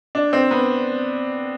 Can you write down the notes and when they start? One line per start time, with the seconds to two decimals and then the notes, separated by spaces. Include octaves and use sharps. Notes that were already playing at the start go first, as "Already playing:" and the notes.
0.15 D4
0.33 C4
0.51 B3